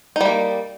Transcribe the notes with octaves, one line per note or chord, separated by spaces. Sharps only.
G3 A#3 D#4